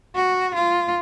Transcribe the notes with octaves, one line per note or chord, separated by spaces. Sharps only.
F#4
F4